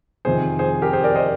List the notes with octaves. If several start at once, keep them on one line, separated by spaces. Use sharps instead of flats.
F2 C3 D#3 G#4 C5
G#4 C5
G4 A#4
G#4 C5
A#4 D5
C5 D#5